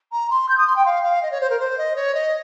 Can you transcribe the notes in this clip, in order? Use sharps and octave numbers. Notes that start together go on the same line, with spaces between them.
A#5
C6
G6
D#6
C6
G5
F5
F5
D#5
C#5
C5
A#4
C5
D#5
C#5
D#5